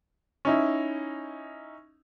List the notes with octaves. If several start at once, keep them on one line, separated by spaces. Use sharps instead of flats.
C#4 D#4 E4